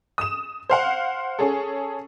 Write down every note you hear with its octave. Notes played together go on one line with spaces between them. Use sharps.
D#6 E7
C5 F5 F#5
C#4 G#4 A4